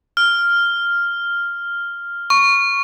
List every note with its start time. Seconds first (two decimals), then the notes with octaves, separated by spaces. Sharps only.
0.17 F6
2.30 C#6